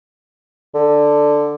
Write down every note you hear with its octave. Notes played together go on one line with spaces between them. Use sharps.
D3